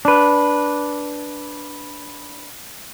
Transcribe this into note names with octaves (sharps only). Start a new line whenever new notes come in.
D4 B4